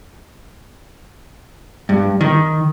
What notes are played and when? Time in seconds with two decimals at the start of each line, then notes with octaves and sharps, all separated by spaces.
1.89 G2
2.21 D#3